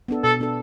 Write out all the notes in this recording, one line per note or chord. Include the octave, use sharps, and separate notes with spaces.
B3 D4 A4
B2 A4
B3 D4 A4